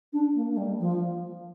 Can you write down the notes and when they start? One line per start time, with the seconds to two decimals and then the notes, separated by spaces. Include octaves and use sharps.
0.13 D4
0.35 A#3
0.51 A#3
0.57 G3
0.80 F3